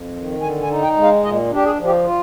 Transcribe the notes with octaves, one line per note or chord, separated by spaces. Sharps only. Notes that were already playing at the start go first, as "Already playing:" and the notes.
Already playing: F2
D#3
D3 G#5
G#5
D#4
G5
G#3
F5
A#2 D#5
D4 G4
G#4
F3
G4
F4